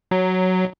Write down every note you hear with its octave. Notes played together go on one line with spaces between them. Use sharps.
F#3